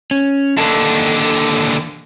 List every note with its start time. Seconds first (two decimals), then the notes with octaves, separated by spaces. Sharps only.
0.11 C#4
0.58 D#2 D3 A4